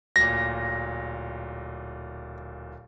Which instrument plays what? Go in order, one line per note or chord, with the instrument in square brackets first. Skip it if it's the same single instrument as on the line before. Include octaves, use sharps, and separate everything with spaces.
[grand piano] D1 A#2 [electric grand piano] A#6